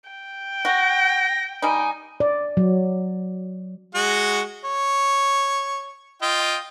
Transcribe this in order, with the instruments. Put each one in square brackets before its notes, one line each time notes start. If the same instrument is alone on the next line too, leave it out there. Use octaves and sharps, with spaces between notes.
[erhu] G5
[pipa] F#4 [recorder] A#6
[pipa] G3 D#4 [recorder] G#5
[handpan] D5
F#3
[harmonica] G#3 F#4 F#5
C#5
F4 D#5 G5